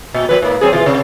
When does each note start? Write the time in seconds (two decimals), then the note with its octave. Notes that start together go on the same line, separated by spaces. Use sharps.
0.14 A#2
0.29 A#2 F3 B4
0.42 G#2 A#3
0.61 F#3 C4 G#4
0.73 B2 E3 F4
0.86 C3